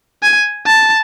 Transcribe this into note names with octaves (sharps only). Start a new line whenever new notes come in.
G#5
A5